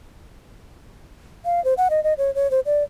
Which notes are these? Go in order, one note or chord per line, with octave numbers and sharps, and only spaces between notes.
F5
C5
F#5
D#5
D#5
C#5
C#5
C5
D5